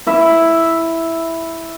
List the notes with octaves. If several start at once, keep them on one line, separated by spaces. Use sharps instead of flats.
E4 E5